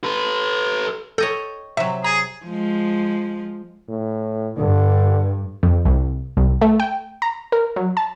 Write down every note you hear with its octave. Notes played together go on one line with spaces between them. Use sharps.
A4 B4
A4 C#5 D#5 G5
C3 F#3 E5
G#4 A#5
F3 G#3
A2
G2 D3
F2
C2
C2
A3
G5
A#5
A#4
F#3
A5